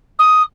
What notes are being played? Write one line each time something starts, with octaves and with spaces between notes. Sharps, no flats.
D#6